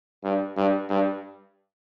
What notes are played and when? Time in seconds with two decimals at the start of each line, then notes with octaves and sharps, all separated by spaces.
0.24 G2
0.57 G2
0.90 G2